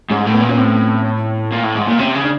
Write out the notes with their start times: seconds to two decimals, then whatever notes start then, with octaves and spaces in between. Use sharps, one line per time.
0.10 G#2 C#4
0.26 A2
0.33 B3
0.41 A#2
0.49 C#4
0.57 A2 C4
1.52 A#2
1.63 A2
1.75 G#2
1.87 A#2
1.99 C3 C#4
2.15 C#3
2.23 D4